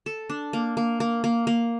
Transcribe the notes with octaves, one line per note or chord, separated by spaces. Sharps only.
A4
D4
A#3
A#3
A#3
A#3
A#3